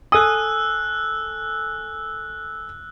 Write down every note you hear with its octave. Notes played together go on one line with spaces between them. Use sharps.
A4 G#5 D#6 E6 F#6